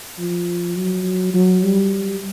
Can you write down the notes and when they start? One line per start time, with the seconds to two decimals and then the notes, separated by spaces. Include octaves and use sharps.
0.19 F3
0.77 F#3
1.34 F#3
1.63 G3